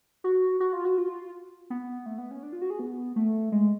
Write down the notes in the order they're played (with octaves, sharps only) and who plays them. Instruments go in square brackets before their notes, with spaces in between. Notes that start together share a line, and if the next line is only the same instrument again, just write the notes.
[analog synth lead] F#4
F#4
F4
F#4
F4
B3
A3
B3
C#4
D4
F4
F#4
G#4
B3
A3
G#3